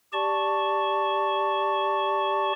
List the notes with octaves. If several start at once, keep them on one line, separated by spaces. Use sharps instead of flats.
G4 D5 A5 C#6